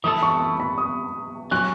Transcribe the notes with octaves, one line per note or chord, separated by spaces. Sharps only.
E3 A3 E4 A4 D#6
C#6
B5
B5
D#6
F#3 C#4 F#4 F#6